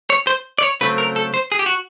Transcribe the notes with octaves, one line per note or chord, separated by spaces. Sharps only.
C#5
C5
D5
C#5
C#3 F#3 A3 C4 B4
A#4
A4
C5
G#4
G4
F#4